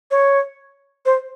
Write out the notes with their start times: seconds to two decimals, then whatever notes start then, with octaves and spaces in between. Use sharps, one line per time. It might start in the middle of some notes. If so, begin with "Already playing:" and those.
0.11 C#5
1.06 C5